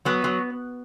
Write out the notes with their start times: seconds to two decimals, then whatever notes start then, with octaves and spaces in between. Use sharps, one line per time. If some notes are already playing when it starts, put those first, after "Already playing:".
0.05 F#3 B3
0.24 F#3